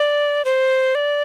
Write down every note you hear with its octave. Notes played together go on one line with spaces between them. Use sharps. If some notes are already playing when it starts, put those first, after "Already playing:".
Already playing: D5
C5
D5